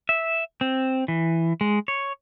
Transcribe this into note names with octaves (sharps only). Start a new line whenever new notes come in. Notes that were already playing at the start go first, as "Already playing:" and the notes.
E5
C4
E3
G#3
C#5